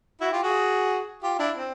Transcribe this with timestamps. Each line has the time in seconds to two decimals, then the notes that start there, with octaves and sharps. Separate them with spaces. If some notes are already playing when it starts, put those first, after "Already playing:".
0.21 E4 F#4
0.32 F4 G4
0.43 F#4 G#4
1.23 F4 G4
1.39 D4 E4
1.57 C4